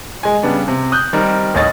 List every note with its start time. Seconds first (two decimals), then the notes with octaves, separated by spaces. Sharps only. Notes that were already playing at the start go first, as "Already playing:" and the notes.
0.23 G#3 G#5
0.43 C#3 G3 B3 D4
0.68 C3
0.92 D#6 F#6 G6
1.13 D#3 G3 C4 A#4
1.54 A1 D#2 C#5 D#5 A6